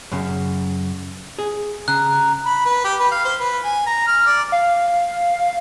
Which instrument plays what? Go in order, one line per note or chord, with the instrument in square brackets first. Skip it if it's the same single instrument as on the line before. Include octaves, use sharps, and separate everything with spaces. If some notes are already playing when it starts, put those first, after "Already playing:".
[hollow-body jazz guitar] F#2 C#3
G#4
[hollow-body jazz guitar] C#3 [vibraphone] A#5 [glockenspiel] F#6
[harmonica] B5
B4
G4
B4
F5
C5
B4
G#5
A#5
F6
D5
[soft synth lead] F5